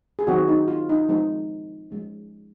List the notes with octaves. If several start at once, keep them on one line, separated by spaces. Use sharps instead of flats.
G#4
D#3 F#3 C4 F#4
D#4
F4
D#4
F3 G#3 C4 D#4
F3 G#3 C#4